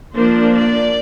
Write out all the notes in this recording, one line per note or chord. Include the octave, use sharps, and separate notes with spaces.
F3 A#3 D4 C5
D5